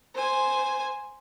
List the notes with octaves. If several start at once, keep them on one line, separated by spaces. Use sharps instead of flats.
C5 G#5